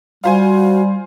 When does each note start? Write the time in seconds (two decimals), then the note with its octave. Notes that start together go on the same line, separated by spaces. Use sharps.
0.24 G3 F4 F#4 C5 G#5